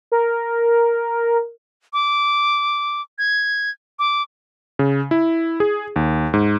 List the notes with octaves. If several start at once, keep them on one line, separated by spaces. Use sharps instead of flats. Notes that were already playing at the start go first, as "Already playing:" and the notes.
A#4
D6
G#6
D6
C#3
E4
G#4
D#2
G#2